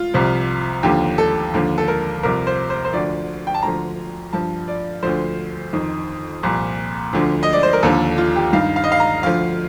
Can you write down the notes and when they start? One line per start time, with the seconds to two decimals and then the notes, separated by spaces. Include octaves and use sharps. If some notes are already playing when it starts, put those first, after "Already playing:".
Already playing: F4
0.14 C2 C3 F3
0.83 D#2 D3 F3 G4
1.18 A4
1.54 D#2 D3 F3
1.78 A4
1.88 A#4
2.23 C2 C3 F3 A#4
2.47 C5
2.70 C5
2.85 C5
2.93 D2 D3 F3 D5
3.47 G5
3.54 A5
3.62 D2 D3 F3 A#5
4.33 G2 F3 A5
4.68 D5
5.03 D2 D3 F3 C5
5.73 F2 D#3
6.43 C2 A#2 F3
7.13 D2 D3 F3
7.43 D#5
7.53 D5
7.63 C5
7.73 A#4
7.83 D#2 D3 F3 A4
8.18 F4
8.36 G4
8.53 G2 D#3 F5
8.76 F5
8.84 D#5
8.92 F5
9.00 A#5
9.23 D2 D3 F3 F5